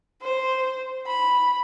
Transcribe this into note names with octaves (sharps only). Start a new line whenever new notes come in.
C5
B5